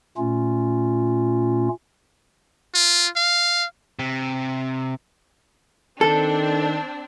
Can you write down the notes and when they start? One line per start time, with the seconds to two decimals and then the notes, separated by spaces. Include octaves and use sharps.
0.17 A#2 A3 C#4 F4
2.75 F4
3.16 F5
3.99 C3
6.01 D#3 C4 D4 A4